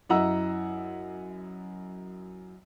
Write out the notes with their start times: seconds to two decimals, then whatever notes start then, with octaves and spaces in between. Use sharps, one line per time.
0.09 F#2 E4 D#5 F#5 A#5 E6